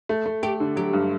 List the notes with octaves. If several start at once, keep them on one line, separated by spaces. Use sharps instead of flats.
A3
A3
A3 G4
D3
F#3 G4
G2